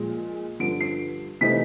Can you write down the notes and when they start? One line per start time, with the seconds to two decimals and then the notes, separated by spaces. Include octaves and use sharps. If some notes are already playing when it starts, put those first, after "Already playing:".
Already playing: A#2 F3 G#3
0.60 G2 D3 F3 D7
0.81 C7
1.41 C3 E3 A3 C4 D#4 B6